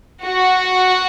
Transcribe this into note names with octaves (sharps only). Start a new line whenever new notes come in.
F#4